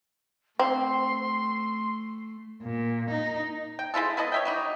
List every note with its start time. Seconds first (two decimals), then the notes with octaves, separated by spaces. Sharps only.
0.59 A3 C4 C6
2.62 A#2
3.11 D#4
3.79 G5
3.94 G#3 E4 F4 A4
4.17 B3 E4 A4 D#5
4.32 C#5 E5 G5
4.45 F#3 G3 D#4